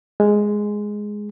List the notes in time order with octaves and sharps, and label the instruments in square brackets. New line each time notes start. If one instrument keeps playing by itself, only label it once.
[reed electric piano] G#3